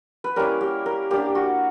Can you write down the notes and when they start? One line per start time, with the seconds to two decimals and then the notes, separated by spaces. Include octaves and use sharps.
0.24 B4
0.36 G3 A#3 C#4 E4 A#4
0.61 G4
0.86 A#4
1.10 A#3 D4 G4
1.35 F#4